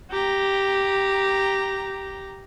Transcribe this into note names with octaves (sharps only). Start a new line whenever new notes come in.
G4 A#5